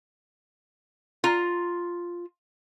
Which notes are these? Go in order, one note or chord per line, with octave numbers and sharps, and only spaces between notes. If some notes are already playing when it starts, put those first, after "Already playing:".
F4 A#5